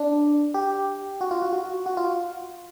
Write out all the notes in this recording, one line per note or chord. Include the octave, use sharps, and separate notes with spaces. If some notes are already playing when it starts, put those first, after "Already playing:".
Already playing: D4
G4
F#4
F4
F#4
F#4
F#4
F4